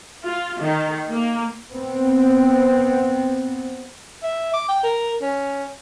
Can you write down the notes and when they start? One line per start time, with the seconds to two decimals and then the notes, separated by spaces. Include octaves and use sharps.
0.25 F4
0.60 D#3
1.10 A#3
1.72 B3 C4
4.23 E5
4.53 D6
4.69 G5
4.83 A#4
5.22 C#4